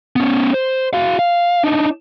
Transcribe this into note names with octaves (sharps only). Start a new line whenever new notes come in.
B3 C#4
C5
F#4 F5
F5
D4 D#4